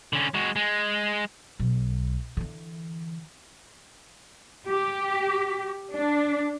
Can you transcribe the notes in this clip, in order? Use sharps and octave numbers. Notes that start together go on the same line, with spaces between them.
D3 C#4
G#3 F#4
G#3
B1
D3 E3
G4
D4